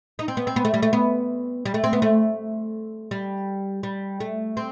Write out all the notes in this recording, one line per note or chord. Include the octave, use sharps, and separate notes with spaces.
D#4
C4
B3
C4
B3
A3
G3
A3
B3
G3
A3
C4
B3
A3
G3
G3
A3
C4